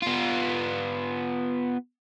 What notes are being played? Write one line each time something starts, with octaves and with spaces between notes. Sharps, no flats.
B3 F4